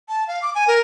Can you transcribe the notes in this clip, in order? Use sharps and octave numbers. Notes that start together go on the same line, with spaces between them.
A5
F5
D6
G#5
A#4